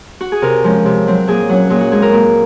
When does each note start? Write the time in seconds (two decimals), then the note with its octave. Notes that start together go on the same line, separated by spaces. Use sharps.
0.21 F#4
0.32 G#4
0.42 C3 A#4
0.64 F3 G#3 C#4
0.85 C3
1.07 F#3 C4
1.28 A#2 G#4
1.49 F#3 C#4 F#4
1.70 A#2 G#4
1.81 F#4
1.91 G#3 C4 G#4
2.02 A#4
2.13 A#2